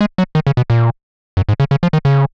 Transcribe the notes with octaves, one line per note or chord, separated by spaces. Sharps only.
G#3
F#3
D#3
C#3
B2
A#2
F#2
G#2
C#3
C#3
F3
D#3
C#3